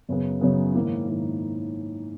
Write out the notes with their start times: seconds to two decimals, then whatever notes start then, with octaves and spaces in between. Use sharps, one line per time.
0.09 F#2 C#3 F#3 B3
0.41 F#2 C#3 F#3 B3
0.74 G#2 D#3 A#3 E4
1.08 G#2 D#3 A#3 E4